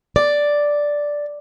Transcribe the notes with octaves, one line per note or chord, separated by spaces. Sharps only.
D5